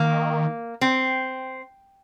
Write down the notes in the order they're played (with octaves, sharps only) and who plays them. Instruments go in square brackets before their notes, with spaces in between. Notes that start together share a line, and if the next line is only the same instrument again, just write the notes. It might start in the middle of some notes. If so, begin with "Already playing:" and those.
Already playing: [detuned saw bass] D#3 [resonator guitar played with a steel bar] A#3
[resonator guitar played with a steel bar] C4